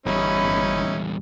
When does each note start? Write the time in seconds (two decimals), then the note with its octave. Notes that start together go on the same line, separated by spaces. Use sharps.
0.06 G1 E2 G3 C#4 D#4 E4 B5